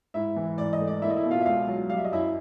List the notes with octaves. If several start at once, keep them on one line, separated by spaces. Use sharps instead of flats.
G#2 E4 E5
E3
G#2 D5
D#5
A3
D5
A#3 E4 E5
D#5
E4 E5
B2
F4 F5
E5
C#2 F4 F5
F#3
G3 F5
E5
D#5
F#2 E4 E5